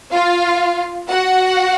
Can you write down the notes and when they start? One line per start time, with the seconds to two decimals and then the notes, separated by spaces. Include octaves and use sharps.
0.12 F4 F5
1.08 F#4 F#5